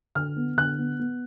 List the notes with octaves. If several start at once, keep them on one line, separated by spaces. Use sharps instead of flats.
D3 F6
B3
D3 F#6
B3
B3